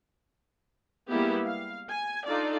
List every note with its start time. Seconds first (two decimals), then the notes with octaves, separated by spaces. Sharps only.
1.09 G3 G#3 A#3 B3 E4 G4
1.45 F5
1.91 G#5
2.27 D4 D#4 F4 A4 D5